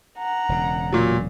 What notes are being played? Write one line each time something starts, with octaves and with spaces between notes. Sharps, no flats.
F#5 A#5
E1 C#3
A#2 F#3